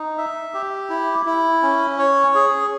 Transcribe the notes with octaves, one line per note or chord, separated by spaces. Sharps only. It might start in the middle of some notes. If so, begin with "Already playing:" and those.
Already playing: D#4
E5
G4
E4
E4
C#4
C#5
G#4